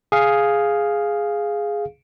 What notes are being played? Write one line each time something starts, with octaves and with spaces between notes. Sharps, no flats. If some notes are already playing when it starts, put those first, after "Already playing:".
G#4 F5